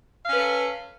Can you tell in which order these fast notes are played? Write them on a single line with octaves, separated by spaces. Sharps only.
F5 C#4 B4 A4